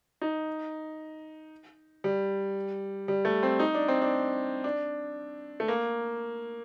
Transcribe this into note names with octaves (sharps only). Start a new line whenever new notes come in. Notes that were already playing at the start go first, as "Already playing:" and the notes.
D#4
G3
G3
A3
C4
D#4
D4
C4
D4
D4
A3
A#3